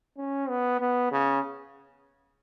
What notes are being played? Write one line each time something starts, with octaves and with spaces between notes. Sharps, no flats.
C#4
B3
B3
C#3